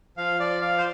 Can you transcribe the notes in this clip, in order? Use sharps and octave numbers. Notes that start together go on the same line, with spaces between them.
F3 F5
F3 D5
F3 F5
C5